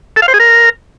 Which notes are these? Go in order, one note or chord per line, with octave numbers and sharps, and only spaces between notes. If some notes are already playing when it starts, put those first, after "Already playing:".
A4
F5
C5
G#4
A#4